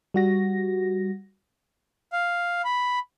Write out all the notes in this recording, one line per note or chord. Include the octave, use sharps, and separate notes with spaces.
G3 F#4 A#6
F5
B5